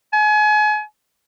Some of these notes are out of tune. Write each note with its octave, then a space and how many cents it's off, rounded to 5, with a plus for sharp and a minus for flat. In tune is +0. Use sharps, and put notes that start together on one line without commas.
G#5 +35